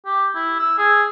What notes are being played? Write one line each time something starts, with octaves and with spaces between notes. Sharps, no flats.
G4
E4
E6
G#4